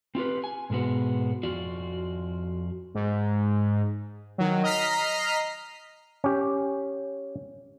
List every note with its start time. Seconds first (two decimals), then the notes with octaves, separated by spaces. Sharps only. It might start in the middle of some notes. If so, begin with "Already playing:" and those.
0.15 C4 F4 G4 B4
0.44 G#5
0.70 G#2 B2 G#3 B3 F#4
1.43 F2 F4 F#4 D5
2.95 G#2
4.38 D#3 F#3
4.63 D#5 A#5 F6 B6 C7
6.24 C#4 G4